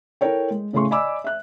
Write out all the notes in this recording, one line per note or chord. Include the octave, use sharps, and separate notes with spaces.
E4 A4 A#4 C#5 G5
G#3
A2 C#3 A3 G#4 C6 C#6
D5 D#5 G#5 B5 D6 E6
E5 F#6